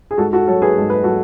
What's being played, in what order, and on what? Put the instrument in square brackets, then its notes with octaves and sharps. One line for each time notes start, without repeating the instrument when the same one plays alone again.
[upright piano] G#4
G#2 F#4 A4
F#4 A4
F#3 A4 C#5
G#4 B4
G#2 A4
B4
F#3 F#4 A4